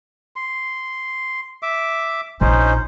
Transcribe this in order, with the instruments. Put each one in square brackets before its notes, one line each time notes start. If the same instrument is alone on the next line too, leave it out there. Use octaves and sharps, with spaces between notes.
[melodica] C6
E5 D6
[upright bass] A#1 [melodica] C#4 D#4 C5